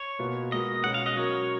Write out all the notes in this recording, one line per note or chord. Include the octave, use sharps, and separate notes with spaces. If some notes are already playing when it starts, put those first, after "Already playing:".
Already playing: C#5
B2 A#3 F4 B4
G#3 B3 F#4 A#4 D#5
B2 G#3 C#4 F#5
F5
D#5
F#3 C#4 F#4 A#4 C#5